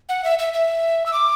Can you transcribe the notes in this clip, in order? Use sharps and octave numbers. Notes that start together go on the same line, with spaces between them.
F#5
E5
E5
E5
E6
D6